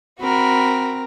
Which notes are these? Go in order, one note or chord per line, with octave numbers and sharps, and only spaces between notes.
C4 F#4 A#4 B5